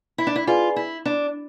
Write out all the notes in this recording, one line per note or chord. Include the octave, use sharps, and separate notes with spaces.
E4
D4
E4
F4 G#4 B4 D5 G#5
E4
D4